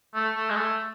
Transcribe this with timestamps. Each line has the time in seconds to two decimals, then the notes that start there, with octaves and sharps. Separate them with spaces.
0.15 A3
0.35 A3
0.50 G#3
0.56 A3